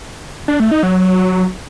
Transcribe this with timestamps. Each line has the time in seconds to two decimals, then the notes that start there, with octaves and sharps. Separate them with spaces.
0.48 D4
0.60 A3
0.71 D#4
0.83 F#3